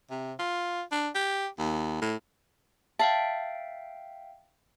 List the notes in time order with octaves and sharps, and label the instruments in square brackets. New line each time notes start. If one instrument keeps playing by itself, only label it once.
[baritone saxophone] C3
F4
D4
G4
D#2
A2
[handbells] E5 F5 G5 [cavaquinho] A5